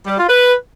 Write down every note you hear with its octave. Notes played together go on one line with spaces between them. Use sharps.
G3
F4
B4